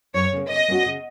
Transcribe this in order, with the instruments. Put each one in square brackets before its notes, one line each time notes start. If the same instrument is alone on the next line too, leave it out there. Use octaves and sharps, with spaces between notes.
[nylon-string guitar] F#2 [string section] C#5
[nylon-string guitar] C#3 A#3
[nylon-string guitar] C#3 [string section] D#5
[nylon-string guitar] A#3 C#4 F#4
C#3